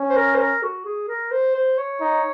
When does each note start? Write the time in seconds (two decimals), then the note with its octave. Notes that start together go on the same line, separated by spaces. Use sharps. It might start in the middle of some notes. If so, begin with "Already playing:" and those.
Already playing: C#4
0.10 C5
0.16 A#4
0.35 C5
0.40 A#4
0.63 F#4
0.85 G#4
1.08 A#4
1.32 C5
1.55 C5
1.78 C#5
2.01 D#4